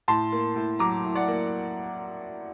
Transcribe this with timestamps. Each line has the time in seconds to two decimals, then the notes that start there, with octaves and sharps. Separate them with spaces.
0.08 A2 A5 C6
0.32 A#3
0.56 A2
0.79 F#3 A#5 D6
1.04 A2
1.15 D5 F#5
1.28 A#3